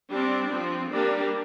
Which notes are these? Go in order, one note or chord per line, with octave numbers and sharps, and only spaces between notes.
G3 C4 D4
F3 C4
G3 A#3 D4